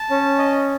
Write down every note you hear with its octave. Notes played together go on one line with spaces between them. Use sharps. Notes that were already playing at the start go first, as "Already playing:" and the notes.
Already playing: A5
C#4
D#5